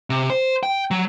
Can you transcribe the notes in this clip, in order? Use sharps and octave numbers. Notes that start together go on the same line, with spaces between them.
C3
C5
G5
F#3